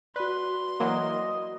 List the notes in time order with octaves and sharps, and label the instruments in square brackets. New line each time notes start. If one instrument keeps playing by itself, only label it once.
[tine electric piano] F#4 D5 [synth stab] B4 [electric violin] C6
[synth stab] E3 F#3 A#3 [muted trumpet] D#5